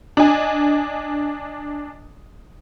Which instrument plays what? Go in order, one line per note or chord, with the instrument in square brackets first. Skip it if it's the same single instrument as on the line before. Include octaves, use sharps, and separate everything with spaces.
[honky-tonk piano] D4 D#5 G#5